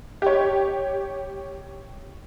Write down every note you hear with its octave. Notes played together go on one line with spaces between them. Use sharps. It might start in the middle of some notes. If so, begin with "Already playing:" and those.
G4 C#5